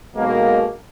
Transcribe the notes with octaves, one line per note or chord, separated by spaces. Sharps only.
B1 B2 G#3 A#3